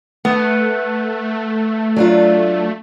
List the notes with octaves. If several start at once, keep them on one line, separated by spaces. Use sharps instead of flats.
A3 B3
F#3 D4 F4